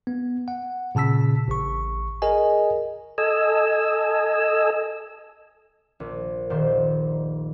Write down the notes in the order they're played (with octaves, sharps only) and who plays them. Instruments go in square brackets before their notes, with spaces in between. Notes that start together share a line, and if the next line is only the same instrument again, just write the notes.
[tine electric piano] B3
F#5
A#2 C#3 A5 E6 B6
A1 C#6
G#4 A#4 D#5 G#5
[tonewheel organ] A4 D#5 G#5 E6
[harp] A#1
D#1 A#2 D#3 C5